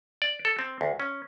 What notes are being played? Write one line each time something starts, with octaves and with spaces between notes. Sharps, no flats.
D5
A4
C4
D2
C#4